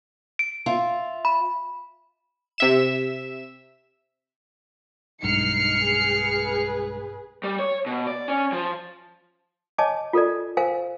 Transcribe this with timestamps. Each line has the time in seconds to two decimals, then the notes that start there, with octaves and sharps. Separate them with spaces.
0.39 D7
0.66 F4 E5
1.25 B5
2.58 C3 E5 E7
5.23 B1 G2 G#3 D#4 F6 C7 C#7
5.84 G#4 B4
7.44 G3
7.59 C#5
7.86 B2
8.07 D5
8.28 C#4
8.52 F3
9.78 C#5 D#5 G#5 A5 D6
10.13 F4 A4 A#4 D5
10.57 A#4 C5 F5 G#5